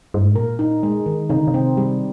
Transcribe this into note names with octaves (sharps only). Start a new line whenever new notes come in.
G2
G#2
A#2 A#4
D#4
G#3
D#3
C3 D#4
D3
C3
C4
G3